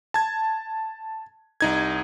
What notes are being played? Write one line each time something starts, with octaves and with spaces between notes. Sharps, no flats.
A5 G#6
C2 D#4 G#6